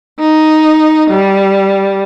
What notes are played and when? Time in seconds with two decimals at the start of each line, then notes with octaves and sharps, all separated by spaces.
0.19 D#4
1.10 G3